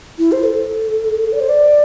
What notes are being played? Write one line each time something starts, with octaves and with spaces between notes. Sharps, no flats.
E4
C5
A4
D5
C5
D5